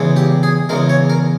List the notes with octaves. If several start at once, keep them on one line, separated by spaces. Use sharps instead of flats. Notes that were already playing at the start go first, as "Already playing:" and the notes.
Already playing: E2 C#3 G#3
G4
G#4
E2 C#3 G#3 A#4
C#5
A#4